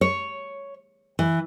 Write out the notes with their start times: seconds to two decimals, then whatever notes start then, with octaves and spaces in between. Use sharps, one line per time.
0.01 C#5
1.19 E3